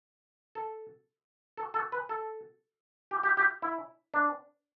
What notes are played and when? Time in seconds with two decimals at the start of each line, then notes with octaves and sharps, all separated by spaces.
0.55 A4
1.57 A4
1.74 A4
1.92 B4
2.09 A4
3.11 G4
3.23 G4
3.37 G4
3.62 E4
4.14 D4